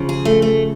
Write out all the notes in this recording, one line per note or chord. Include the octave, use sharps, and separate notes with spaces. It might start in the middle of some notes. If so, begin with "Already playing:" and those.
Already playing: C#3 F3
G#4
A3
A3